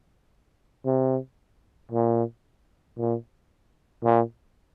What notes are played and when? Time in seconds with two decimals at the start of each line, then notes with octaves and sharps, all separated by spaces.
0.86 C3
1.92 A#2
2.98 A#2
4.04 A#2